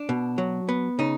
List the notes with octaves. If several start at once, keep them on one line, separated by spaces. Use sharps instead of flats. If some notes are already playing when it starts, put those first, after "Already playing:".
Already playing: D4
B2
F#3
B3
C#3 D#4